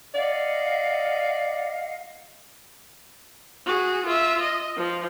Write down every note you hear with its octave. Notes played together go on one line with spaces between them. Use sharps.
D5 D#5 F5 F#5
F#4 G#4
F4 E5
D#5
F3